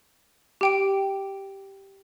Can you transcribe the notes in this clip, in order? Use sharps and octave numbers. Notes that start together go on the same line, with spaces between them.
G4 G5 D7